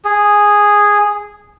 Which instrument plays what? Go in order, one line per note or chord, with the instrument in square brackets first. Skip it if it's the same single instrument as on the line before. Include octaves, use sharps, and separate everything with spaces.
[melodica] G#4